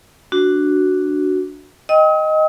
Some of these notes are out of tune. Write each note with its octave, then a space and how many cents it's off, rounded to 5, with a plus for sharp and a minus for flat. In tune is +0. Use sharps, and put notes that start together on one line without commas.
D4 +0 F#4 +0
D#5 +0 G5 +0 D#6 +45